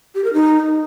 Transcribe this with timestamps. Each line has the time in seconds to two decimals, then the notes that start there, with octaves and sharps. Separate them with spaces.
0.15 G4
0.24 A#4
0.33 D#4